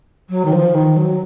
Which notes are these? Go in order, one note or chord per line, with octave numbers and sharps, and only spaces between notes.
F#3
D#3
F3
D#3
F#3